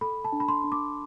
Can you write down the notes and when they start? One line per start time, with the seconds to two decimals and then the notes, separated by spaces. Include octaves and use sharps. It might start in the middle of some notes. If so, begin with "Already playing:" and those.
0.01 A4 B5
0.24 A5
0.33 D4
0.40 B5
0.48 C6
0.64 D4
0.72 D6